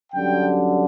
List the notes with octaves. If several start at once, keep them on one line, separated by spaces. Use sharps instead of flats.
F#2 D3 G3 G5